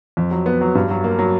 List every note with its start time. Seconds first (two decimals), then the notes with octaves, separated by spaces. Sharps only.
0.17 F2
0.31 F#3
0.46 B3
0.61 F#3
0.75 G2
0.90 F#3
1.04 A#3
1.19 F#3